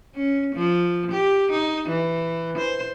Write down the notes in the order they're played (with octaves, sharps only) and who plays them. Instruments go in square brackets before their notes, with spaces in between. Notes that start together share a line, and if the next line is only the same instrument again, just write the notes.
[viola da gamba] C#4
F3
G4
D#4
E3
C5